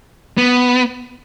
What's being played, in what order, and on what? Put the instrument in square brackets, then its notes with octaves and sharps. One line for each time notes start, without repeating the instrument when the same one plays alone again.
[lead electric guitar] B3